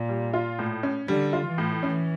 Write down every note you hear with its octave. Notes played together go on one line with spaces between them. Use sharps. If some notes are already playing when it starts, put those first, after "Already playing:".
Already playing: A#2
G3
F4
A2
C#4
D3 G3
F4
E3
A2
E3 C#4